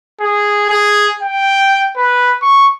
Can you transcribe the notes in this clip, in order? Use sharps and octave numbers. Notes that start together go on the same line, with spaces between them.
G#4
G#4
G5
B4
C#6